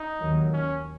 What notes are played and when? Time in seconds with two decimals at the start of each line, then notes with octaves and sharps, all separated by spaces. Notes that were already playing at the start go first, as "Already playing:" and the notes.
Already playing: D#4
0.22 D#2 D#3 F#3
0.53 C#4